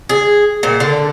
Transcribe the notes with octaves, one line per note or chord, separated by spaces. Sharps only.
G#4
A#2
D3